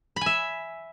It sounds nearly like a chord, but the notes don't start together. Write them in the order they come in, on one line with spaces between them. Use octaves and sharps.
B5 G#5 E5